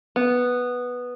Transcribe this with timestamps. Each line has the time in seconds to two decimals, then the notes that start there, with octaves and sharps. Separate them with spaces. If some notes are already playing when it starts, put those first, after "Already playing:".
0.16 B3